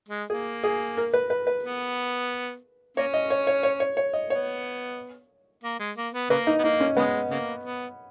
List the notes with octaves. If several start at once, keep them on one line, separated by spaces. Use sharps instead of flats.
G#3
A#3 G#4
G#4
A#4
B4
B4
B4
B3
A#3 C#4 C#5
D#5
C#5
C#5
C#5
C#5
C#5
D#5
B3 C#5
A#3
G#3
A#3
B3
C#3 A#3 B4
D#4
B3
A#3 D#4
C#4
C#3 G#3 B3
C#3 A#3
B3